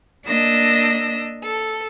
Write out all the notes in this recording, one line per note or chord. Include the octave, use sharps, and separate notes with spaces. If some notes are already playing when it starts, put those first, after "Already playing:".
A#3 D4 D#5 E6 A#6
A4